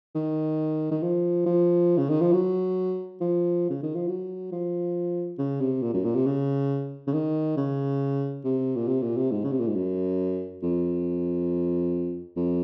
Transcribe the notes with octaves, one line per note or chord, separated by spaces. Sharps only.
D#3
D#3
F3
F3
C#3
D#3
F3
F#3
F3
C#3
D#3
F3
F#3
F3
C#3
C3
A#2
F#2
A#2
C3
C#3
C#3
D#3
C#3
C3
A#2
C3
A#2
C3
G#2
C#3
C3
A#2
G#2
F#2
F2
F2